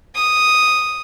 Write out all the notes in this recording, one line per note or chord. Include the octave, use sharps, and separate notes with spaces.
D#6